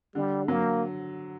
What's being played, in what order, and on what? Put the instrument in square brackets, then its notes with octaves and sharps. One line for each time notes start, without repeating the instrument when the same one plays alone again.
[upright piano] D3 [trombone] G3
[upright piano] F#3 [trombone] A#3